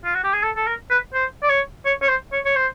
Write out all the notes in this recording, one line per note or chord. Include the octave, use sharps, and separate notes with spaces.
F4
F#4
G4
G#4
A4
A4
A#4
B4
C5
D5
C#5
C#5
C#5
C5
C#5
C#5
C5